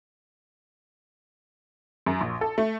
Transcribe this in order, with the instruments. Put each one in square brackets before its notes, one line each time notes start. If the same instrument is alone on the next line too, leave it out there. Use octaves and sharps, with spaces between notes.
[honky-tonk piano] F#2
A#1
A4
A3